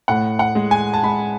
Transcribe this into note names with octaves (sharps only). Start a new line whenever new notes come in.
A2 F#5
F#5
G#3
G#5
A5
G#3 B5